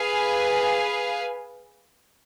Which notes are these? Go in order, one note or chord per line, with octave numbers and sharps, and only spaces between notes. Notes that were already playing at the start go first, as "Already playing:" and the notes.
Already playing: G#4 B4 F5 G#5